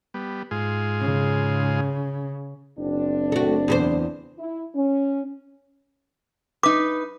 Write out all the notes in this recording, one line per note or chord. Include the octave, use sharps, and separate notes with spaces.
G3 B3
G#2 F4 G#4
C#3
F#1 C4 D4
A3 F#4
E2 G4 C5
E4
C#4
D#4 B4 D6